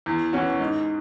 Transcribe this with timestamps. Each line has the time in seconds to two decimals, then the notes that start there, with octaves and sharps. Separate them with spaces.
0.06 E2
0.33 E3 C#4 F#4
0.60 G#2